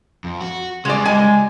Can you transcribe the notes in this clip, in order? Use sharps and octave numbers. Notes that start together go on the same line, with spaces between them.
F2
F#4
C#3 G3 G#3 D5
G#3 G#5